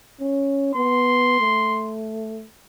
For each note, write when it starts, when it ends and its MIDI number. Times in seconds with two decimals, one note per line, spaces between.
0.21 0.74 61
0.75 1.39 59
0.75 1.92 84
1.40 2.46 57